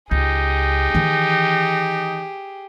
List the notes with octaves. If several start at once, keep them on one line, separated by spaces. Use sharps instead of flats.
C#2 D#4 G4 G#4
D#3 E3